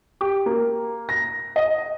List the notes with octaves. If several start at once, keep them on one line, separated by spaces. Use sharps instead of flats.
G4
A#3
A#6
D#5